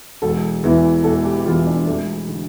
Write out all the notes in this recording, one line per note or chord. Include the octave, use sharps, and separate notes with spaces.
E1 A4
E2 E3
E1 A4
G4
E2 E3 F4
D4
E1 A3
D3